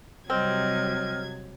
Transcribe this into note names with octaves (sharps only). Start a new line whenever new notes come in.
C3 F#3 G3 C4 D#5 F6 G#6